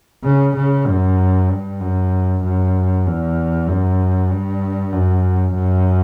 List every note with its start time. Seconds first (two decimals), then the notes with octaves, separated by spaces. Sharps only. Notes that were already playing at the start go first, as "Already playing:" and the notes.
0.24 C#3
0.56 C#3
0.87 F#2
1.50 G2
1.80 F#2
2.44 F#2
3.06 E2
3.67 F#2
4.30 G2
4.92 F#2
5.55 F#2